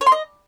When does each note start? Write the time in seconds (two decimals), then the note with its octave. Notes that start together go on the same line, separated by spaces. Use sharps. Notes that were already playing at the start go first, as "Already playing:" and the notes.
0.01 C#5
0.06 C6
0.12 D#5